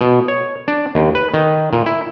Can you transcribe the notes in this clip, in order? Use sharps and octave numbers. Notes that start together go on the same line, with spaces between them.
B2
C#5
D4
D#2
B4
D#3
A#2
E4